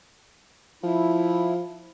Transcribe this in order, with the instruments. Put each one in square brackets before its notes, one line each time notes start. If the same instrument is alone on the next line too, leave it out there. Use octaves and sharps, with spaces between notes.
[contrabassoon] F3 [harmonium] E4